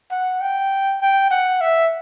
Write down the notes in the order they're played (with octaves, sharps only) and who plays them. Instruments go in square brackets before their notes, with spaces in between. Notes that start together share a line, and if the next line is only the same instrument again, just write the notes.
[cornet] F#5
G5
G5
F#5
E5